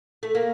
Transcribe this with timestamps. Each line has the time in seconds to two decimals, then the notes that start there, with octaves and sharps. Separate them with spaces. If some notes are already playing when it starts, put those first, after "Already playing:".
0.23 A3
0.35 A#3